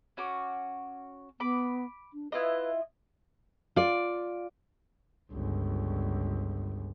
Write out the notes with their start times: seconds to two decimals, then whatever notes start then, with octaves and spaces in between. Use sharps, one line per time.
0.17 C#4 F#4 D6
1.40 B3 B5 D6
2.14 D4
2.32 E4 F4 B4 D#5
3.76 F4 D5
5.32 G1 C#2